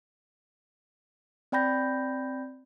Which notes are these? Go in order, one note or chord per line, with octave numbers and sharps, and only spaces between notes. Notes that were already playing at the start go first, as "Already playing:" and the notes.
C4 D5 G5 B5 G6 A#6